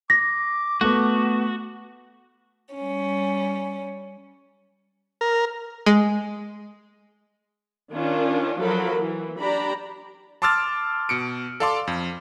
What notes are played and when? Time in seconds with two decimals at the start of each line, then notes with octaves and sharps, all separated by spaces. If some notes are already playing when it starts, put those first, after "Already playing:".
0.10 D6 A#6
0.81 A3 B3 F#4
2.74 G3 C#4
5.21 A#4
5.86 G#3
7.93 D#3 C#4 D4 F4
8.59 F3 F#3 A4 A#4 B5
8.98 E3
9.39 D4 G4 A#5 B5
10.42 A5 C6 D6 E6 F6 A6
11.09 B2 C#7 D7
11.60 A4 D5 F5 A5 C6 D6
11.87 F2